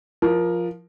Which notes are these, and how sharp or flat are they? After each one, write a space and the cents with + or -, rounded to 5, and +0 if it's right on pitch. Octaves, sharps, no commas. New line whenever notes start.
F3 +0 A#4 +15